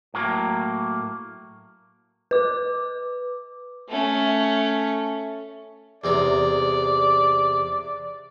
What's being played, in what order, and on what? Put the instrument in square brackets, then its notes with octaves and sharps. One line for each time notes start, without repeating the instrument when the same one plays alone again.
[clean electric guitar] A2 F#3 A#3
[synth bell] B4 D6
[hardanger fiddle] A3 C#4
[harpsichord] E2 C3 D#4 [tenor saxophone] D5